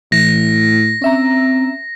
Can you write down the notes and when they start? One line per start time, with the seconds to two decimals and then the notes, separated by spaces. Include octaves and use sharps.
0.12 A2 E3 A#6
1.02 C4 C#4 E5 A#5